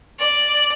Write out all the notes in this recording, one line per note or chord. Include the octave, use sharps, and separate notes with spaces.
D5